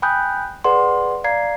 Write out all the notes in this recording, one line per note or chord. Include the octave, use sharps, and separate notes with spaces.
G5 G#5 B5 D#6 F#6 G6
G#4 B4 D5 F#5 C6
D5 F5 A#5 G#6 C7